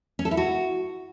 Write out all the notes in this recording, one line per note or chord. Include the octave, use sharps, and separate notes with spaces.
C#4
A4
E4
F#4